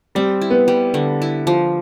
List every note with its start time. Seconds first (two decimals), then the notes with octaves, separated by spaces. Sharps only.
0.15 G3 C4
0.41 E4
0.50 B3
0.68 G3
0.94 D3
1.22 E4
1.47 F3